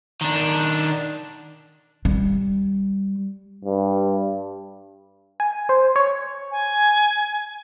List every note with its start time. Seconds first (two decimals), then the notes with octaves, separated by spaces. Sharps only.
0.21 D#3 D4
2.05 G3
3.65 G2
5.40 G#5
5.69 C5
5.96 C#5
6.51 G#5